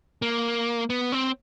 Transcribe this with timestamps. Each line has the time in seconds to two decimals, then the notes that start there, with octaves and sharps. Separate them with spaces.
0.22 A#3
0.90 B3
1.12 C4